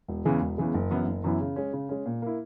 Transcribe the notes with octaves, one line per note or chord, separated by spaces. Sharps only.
E1
E2 C#3 E3 G#3
E1
E2 C#3 E3 G#3
F#1
F#2 E3 B3 E4
F#1
F#2 E3 B3 E4
C#3
G#3 C#4
C#3
G#3 C#4
A#2
A#3 E4